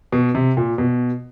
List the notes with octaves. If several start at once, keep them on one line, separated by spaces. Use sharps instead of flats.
B2
C3
A#2
B2